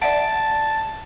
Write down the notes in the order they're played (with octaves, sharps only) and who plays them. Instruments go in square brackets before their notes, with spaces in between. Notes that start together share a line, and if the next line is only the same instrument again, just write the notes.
[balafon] D5 E5 F#5 [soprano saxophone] A5